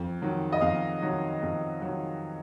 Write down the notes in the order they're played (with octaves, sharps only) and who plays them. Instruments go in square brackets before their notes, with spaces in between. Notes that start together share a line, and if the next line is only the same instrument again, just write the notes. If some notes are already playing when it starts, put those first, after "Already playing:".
Already playing: [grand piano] F2
D#3 F#3
D#5
F2 F5
D#3 F#3
F2
D#3 F#3